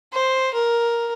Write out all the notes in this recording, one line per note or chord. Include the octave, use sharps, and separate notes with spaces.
C5
A#4